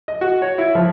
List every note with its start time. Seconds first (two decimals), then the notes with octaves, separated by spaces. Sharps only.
0.08 D#5
0.21 F#4
0.42 C#5
0.58 E4
0.75 F3